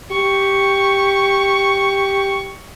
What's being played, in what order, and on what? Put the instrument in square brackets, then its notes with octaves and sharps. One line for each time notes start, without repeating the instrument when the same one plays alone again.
[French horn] G4 [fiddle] C#6